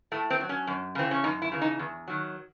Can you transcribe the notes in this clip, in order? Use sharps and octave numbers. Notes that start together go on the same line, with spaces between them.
A2 A3
C4
F#3
C#4
F#2
C#3 E3 C4
C#4
F#2 D#4
E4
C#3 E3
D#4
E2
D#3 F#3